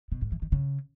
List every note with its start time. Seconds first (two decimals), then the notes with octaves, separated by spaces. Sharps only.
0.12 B2
0.22 G#2
0.32 E3
0.42 D#3
0.52 C#3